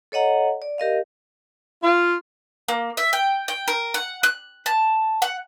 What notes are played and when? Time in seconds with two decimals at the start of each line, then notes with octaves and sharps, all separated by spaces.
0.12 A4 C#5 D#5 F#5 A#5
0.62 D5
0.78 G4 A#4 D#5 F5
1.83 F4
2.68 A#3
2.97 E5
3.13 G5
3.48 G5
3.68 A#4
3.94 F#5
4.23 F#6
4.66 A5
5.22 F#5